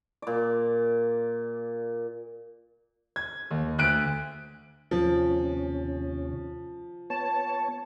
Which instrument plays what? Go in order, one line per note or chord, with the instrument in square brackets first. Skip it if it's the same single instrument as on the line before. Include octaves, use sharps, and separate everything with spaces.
[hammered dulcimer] A#2 D5
[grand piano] G#6
D#2
D2 F#6 D7
[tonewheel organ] D#2 C3 C#4 [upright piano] F3
[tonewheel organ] B3 C#5 [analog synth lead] A5